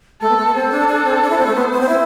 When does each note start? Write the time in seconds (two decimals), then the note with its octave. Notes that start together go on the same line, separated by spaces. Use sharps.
0.21 A3 A4
0.29 B3
0.37 A3
0.46 B3
0.55 C4 A4
0.72 D4
0.88 D4
1.05 C4
1.22 D4
1.30 E4
1.38 C4
1.46 A3
1.55 B3 C5
1.72 B3
1.81 C4
1.89 E4